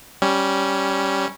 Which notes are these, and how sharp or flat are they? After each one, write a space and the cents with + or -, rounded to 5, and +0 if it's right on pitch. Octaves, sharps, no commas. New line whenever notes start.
G3 -10 C#4 +0